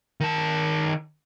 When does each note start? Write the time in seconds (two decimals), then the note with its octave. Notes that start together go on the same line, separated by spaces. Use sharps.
0.20 D#3 A5